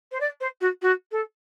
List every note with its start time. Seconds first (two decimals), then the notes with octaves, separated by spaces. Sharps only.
0.12 C5
0.20 D5
0.41 C5
0.61 F#4
0.82 F#4
1.12 A4